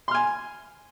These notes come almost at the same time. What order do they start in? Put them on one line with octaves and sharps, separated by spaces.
C6 F6 G#5